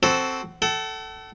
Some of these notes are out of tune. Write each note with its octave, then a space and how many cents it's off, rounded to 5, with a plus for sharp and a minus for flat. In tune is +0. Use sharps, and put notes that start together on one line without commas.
C4 +0 F#4 +15 A4 +0
A4 +0 F#5 +45